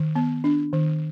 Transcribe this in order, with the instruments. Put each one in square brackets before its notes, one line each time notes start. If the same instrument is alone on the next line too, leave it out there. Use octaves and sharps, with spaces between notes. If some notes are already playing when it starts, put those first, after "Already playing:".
Already playing: [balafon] D#3
B3
D4
D#3